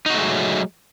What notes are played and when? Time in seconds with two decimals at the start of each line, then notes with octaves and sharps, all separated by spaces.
0.06 D#4
0.10 F#4
0.14 A3
0.18 G#3
0.23 F#3